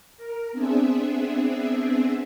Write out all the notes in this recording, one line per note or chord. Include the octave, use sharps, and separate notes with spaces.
A#4
B3 C4 D4 G#4 E5